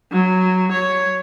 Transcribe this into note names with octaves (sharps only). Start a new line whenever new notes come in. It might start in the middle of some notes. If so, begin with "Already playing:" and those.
F#3
C#5